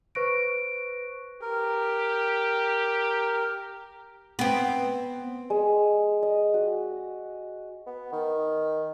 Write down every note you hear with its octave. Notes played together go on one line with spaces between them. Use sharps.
B4 C5 C#6 F#6 A#6 D7
G4 A#4
B3 C4
G#3
D#5
F#4
B3
D#3